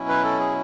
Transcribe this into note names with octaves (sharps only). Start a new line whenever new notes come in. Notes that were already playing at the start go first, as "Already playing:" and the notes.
Already playing: B2 F#3 C#4 E4
B4
A4
G#4